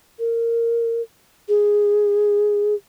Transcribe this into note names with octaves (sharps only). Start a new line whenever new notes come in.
A#4
G#4